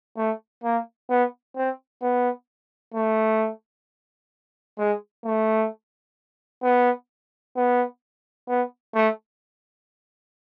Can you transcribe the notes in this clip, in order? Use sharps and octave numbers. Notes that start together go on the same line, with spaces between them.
A3
A#3
B3
C4
B3
A3
G#3
A3
B3
B3
B3
A3